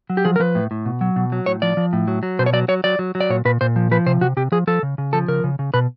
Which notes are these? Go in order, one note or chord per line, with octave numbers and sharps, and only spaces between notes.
F#3
G4
F3 G#4
A#4
F3 B4
A2
A2
B2
F#3
B2
F#3
A2 C#5
F3 D5
F3
A2
F#3
F#3
B2 C5
C#5
F#3 D5
F#3 C#5
F#3 D5
F#3
F#3
D5
A#2 C#5
A#2 B4
A#2 C5
F3
F3 B4
C3 C5
C3 F#4
C3 G4
F3 G#4
F3 A4
C#3
C#3
F3 A4
C#3 A#4
C#3
C#3
B2 B4